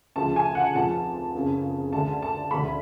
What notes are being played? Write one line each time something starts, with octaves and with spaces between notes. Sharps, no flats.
D2 C#3 F3 G#3 A5
G#5
F#5
F1 F2 F3 G#3 A5
F#1 F2 C#3
D2 D3 G#3 A5
A5
D2 D3 G#3 B5